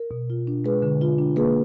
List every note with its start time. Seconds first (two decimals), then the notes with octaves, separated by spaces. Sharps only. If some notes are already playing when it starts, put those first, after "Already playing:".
Already playing: A#4
0.11 B2
0.30 F4
0.47 D4
0.64 G#3 G#4 B4
0.82 D3
1.02 F4
1.18 D4
1.36 A#3 G#4 B4